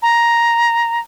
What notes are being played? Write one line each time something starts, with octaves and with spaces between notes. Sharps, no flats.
A#5